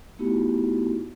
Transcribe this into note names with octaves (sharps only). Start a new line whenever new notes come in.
A3 B3 D#4 E4 F#4 G4